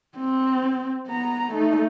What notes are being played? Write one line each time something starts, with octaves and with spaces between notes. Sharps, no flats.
C4
B3 A#5
A3 D#4